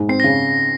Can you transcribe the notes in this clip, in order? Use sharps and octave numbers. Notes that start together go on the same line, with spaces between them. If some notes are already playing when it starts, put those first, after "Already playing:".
Already playing: G#2
C4 C7
A#6
C#3